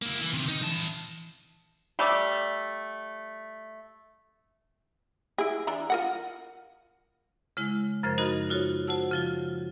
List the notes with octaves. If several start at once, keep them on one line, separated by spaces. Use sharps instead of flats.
A#3 E4
E3
C3 D#3
D#4
E3 A5
G3 A3 D5
E4 G#4
E3 D4 A#5
F4 A#4 F#5
C#3 G#3 E4
F#2 C#3 F3 A#4 C5 G#6
D#4 F#4 A#4 D#5 B5
D#4 F4 F#4 A4 C#5
F#4 C5 F#5 A5 E6
C#3 F3 F4